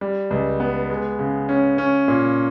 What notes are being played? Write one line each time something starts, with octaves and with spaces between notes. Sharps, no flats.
G3
C#2
B3
G#3
C#3
C#4
C#4
A#2